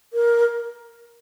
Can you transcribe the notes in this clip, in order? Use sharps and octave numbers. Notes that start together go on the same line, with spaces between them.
A#4